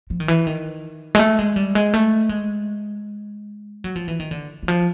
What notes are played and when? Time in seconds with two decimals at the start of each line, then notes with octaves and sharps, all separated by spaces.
0.10 F3
0.20 D#3
0.28 E3
0.47 D#3
1.15 G#3
1.19 A3
1.39 G#3
1.56 G3
1.75 G#3
1.94 A3
2.29 G#3
3.84 F#3
3.96 F3
4.08 E3
4.20 D#3
4.31 D3
4.63 E3
4.68 F3